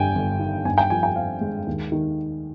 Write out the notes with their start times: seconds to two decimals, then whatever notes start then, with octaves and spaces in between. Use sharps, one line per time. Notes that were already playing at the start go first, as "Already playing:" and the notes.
Already playing: G1 G2 G5 G#5
0.15 G1
0.40 D#3
0.65 G2 G#5
0.78 G5
0.90 F3 G#5
1.03 G5
1.16 C4 F5
1.41 G#3
1.67 D#2
1.92 D#3